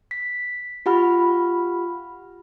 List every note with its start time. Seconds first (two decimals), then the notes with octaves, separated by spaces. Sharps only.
0.11 B6
0.86 F4 G4 F#5 B5 F6